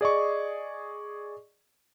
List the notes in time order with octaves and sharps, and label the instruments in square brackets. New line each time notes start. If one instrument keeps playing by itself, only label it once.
[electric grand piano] G#4 D5 D#5 C#6